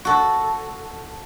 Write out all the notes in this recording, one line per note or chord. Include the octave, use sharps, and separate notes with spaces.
F#4 A4